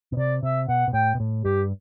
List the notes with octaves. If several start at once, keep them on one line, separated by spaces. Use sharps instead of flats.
B2
C3 D5
C3 E5
B2 F#5
B2
A2 G5
B2
A2
G2 G4